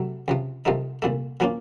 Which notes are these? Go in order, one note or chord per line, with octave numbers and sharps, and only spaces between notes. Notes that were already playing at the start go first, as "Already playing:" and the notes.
Already playing: C3 F#3 A3
C#2 C3 F3
C2 C3 F3 A3 D#4
C2 A#2 A3
A#2 F3 A#3 C#4 F4